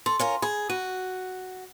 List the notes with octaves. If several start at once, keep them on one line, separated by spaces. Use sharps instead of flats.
A4 C6
C#4 F4 A#4
G#4 B5
F#4 D#7